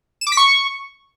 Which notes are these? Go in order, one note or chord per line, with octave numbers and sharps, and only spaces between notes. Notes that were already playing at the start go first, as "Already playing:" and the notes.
E7
D6
B6
C#6